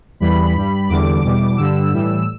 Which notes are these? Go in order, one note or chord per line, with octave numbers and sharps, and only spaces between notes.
E2 E3 G3 B5
G2 G3
E2 D3 G3 D6
E2 B2 G3
G2 D3 G3 E6
A2 E3 G3